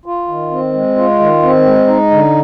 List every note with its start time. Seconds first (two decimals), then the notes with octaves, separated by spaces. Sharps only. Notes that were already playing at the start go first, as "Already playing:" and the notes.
0.06 F4
0.28 D#3
0.51 C4
0.73 G#3
0.97 F4
1.19 D#3
1.43 C4
1.65 G#3
1.87 D#4
2.11 D3